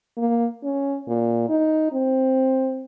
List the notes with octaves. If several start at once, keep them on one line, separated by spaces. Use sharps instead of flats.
A#3
C#4
A#2
D#4
C4